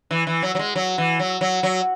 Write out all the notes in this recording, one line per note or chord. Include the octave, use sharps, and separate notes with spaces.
E3
E3
F#3
F#3
G#3
F#3
E3
F#3
F#3
F#3